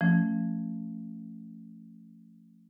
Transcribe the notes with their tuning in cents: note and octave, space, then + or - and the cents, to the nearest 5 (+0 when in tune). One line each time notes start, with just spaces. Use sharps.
F3 -5 A3 +15 C#4 +0